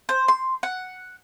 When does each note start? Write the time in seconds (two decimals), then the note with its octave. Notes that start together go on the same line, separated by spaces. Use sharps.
0.09 C5
0.28 C6
0.63 F#5